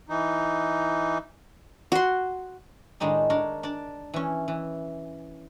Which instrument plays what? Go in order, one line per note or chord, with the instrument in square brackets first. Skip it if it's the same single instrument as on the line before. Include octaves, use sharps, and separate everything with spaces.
[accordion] E3 D#4
[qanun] F#4 C6
[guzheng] A2 D#3 G#3 D4 D#4
D4 A#4 C#5
D4 D5
E3 C#4
E3